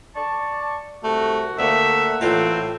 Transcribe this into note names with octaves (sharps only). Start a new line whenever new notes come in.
D5 A5 C#6
C2 A3 F#4
D2 A3 A#3 E5 F#5
A1 A2 C4 F4